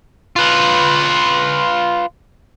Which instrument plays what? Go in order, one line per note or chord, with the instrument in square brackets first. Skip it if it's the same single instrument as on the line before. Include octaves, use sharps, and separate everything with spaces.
[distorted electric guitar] F4 B4